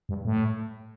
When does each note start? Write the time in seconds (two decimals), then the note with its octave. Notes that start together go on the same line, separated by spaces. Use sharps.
0.09 G2
0.25 A2